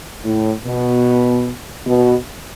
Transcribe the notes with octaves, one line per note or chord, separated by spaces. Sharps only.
A2
B2
B2